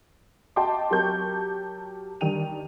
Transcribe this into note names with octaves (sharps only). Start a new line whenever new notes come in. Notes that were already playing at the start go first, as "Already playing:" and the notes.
F#4 D#5 G5 A5 C6 D6
F#3 G4 A#4 A5 C#6 G6
D#3 G3 D4 G5 D#7 F7